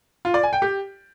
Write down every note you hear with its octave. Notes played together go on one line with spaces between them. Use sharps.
F4
D5
G#5
G5
G4